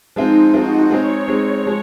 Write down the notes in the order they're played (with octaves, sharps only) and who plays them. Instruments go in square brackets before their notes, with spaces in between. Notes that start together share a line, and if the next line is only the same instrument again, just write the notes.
[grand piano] F3 G#3 C4 F4 [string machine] D#4
[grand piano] F3 G#3 C4 F4 [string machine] F#4
[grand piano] G#3 C4 D#4 G#4 [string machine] C#5
[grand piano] G#3 C4 D#4 G#4
F3 G#3